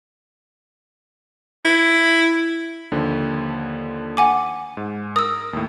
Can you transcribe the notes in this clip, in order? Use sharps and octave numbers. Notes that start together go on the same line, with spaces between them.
E4
D#2 D3 F3
F#5 G#5 D6
G#2
A#4 D#6 E6
D#2 A2